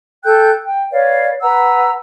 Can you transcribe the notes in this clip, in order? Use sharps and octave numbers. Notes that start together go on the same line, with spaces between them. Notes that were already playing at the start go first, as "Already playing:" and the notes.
A4 G5 F#6 G6
G5
B4 C#5 D5 F5
B4 F#5 A#5 E6